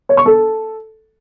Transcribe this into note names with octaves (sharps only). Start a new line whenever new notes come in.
C#5
C#6
A4